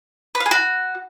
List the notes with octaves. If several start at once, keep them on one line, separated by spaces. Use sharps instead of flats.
B4
F5
G#4
F#4